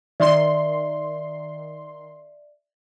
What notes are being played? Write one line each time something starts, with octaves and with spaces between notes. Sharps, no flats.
D#3 D5 E5 C6